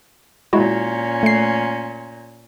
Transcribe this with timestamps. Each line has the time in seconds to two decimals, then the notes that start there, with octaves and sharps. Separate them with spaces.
0.53 A#2 G#3 C#4 E4 F#4
1.23 A3 C7